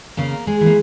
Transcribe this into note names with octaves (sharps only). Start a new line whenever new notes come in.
C#3 A#3 A#4
G#3 G#4
E3
A#3